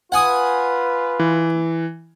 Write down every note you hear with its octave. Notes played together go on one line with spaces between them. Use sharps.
F4 B4 F#5 G#5 D#6
E3